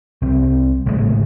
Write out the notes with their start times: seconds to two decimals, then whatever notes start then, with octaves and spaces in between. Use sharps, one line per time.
0.22 C2 C4
0.86 G#1 A2 C#3 G#3